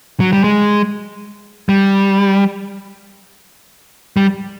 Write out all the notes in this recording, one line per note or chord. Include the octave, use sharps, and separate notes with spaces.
F#3
G3
G#3
G3
G3